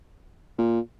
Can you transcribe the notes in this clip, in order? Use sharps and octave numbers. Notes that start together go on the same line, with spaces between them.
A#2